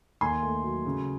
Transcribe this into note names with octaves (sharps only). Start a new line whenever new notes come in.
D#2 G#5 C6
A3
F#3
C#3